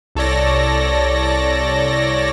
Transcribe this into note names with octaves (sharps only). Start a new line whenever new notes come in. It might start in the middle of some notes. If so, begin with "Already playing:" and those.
C2 A4 C#5 D5 A#6